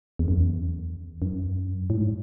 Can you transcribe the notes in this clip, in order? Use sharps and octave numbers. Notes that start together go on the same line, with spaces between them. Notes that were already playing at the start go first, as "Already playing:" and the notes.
E2
F#2
E2
F#2
A2
G#2